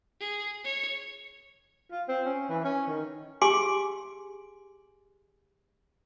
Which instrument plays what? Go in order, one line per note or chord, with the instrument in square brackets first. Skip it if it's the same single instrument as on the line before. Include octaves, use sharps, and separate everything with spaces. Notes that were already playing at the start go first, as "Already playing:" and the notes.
[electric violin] G#4
C#5
[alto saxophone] F4
C4
C#4
E3
C#4
D#3
[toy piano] G4 G#4 G#5 C6 D6